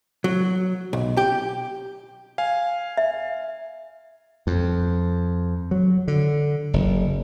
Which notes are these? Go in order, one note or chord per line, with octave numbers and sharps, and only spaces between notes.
F#3
B1
G4
F5 G#5
E5
F2
F#3
D3
F#1